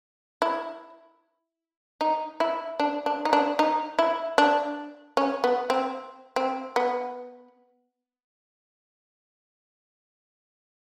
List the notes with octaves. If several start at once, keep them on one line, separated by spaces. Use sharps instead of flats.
E4
D#4
E4
D4
D4
D#4
D4
D#4
E4
D4
C#4
B3
C4
C4
B3